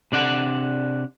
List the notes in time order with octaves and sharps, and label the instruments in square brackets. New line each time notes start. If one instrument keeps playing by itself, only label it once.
[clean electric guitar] C3 D4 D5 F#5